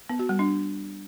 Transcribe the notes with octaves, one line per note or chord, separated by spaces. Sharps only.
B3
F#4
G3
D4